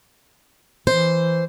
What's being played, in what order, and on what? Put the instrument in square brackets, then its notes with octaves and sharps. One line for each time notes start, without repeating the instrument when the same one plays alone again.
[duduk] E3 [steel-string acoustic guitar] C5